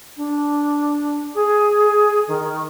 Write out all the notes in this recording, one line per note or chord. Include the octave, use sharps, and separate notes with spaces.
D4
G#4
D#3